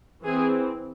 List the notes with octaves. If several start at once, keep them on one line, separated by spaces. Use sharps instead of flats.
E3 C4 G#4